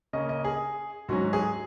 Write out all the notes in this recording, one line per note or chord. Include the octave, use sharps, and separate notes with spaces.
C#3 A#3 C#4 D#5
D#5
G#4
G#2 F#3 C#4 F#4
G#4